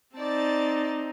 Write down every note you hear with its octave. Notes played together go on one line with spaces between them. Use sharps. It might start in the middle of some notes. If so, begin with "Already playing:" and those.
C4 D#4 D5 A5